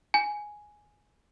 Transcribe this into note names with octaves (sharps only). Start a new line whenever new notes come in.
G#5